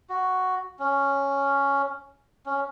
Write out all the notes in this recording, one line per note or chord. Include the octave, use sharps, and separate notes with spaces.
F#4
C#4
C#4